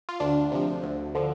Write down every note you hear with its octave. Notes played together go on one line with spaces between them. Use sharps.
F4
D2 D4
C3 F3
D2
D3 F3